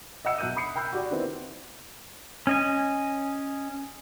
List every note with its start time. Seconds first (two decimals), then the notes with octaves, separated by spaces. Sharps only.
0.25 D#5 E5 F#5 E6 C#7
0.38 B1 E5 F#6 G6 D#7
0.56 B5 D#6 C7 C#7
0.76 G5 B5 E6 F#6 G6
0.92 F#4 G4 D5
1.11 D#3 B3 C4 E4
2.47 C#4 D#5 G#5